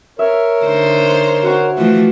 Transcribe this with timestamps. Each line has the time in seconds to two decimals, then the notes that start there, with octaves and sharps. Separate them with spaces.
0.19 A#4 C#5 E5
0.64 D3 D#4 C5
1.43 F#4 F#5 C#6
1.77 E3 F3 A3 F#5